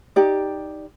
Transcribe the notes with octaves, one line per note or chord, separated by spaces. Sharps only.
D#4 G4 D5